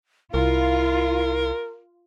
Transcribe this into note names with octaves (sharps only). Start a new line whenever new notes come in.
C2 E4 F4 A#4